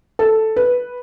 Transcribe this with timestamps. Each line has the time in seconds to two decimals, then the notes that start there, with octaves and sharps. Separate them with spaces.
0.19 A4
0.56 B4